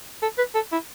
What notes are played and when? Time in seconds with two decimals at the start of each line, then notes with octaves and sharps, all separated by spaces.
0.22 A4
0.38 B4
0.55 A4
0.72 E4